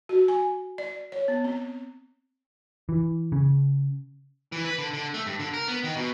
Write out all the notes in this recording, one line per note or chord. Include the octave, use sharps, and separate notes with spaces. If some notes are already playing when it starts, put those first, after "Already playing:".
F#4
G#5
D5
C#5
B3
C4
E3
C#3
E3
B4
D3
D3
A3
G2
D3
A#4
B3
D#3
B2